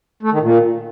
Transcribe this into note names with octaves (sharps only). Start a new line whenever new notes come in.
A3
D#3
A#2